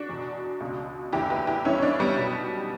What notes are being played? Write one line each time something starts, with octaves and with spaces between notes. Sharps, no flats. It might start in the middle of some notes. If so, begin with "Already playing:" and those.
Already playing: D4 F#4
E2 B2
C#2 B2
F#1 E2 D3 E4 G4
G4 B4
E4 G4
G1 G2 E3 C#4 E4
C#4
B3 D4
G3 B3
B1 B2